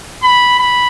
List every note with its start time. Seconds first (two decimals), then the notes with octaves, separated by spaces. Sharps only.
0.23 B5
0.59 B5